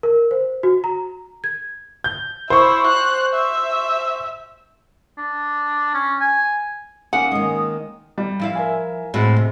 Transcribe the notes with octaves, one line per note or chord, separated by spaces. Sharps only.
A#4
C5
F#4
A#5
G#6
G6
E4 C5 C#6
F#6
E5
D4
C#4
G#5
A#3 C#4 D#4 F#5
D#3 G#3 D#6
G3
F3 E4 F5
A#4 E5 G#5
A2 G#3 C4 F#4
C3